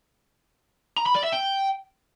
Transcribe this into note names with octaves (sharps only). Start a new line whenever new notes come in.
A#5
B5
D5
E5
G5